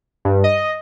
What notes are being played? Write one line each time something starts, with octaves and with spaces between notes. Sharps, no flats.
G2
D#5